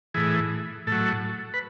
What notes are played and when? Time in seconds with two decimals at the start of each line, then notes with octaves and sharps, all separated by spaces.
0.14 A2 E3 G#4
0.87 A2 F#3 A4
1.54 B4